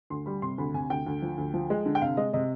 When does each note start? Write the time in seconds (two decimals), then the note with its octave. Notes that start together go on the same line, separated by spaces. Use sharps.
0.10 D2 C6
0.26 G3 B5
0.42 C3 C6
0.58 D2 B5
0.74 C3 G#5
0.90 D2 G5
1.07 D2
1.22 F3
1.38 D2
1.54 F3
1.70 G#3
1.86 D3
1.95 G5
2.02 C3 F5
2.17 G#3 D#5
2.33 C3 D#5